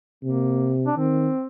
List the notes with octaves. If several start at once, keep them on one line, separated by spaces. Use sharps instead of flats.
C3 A#3
D4
D#3 C4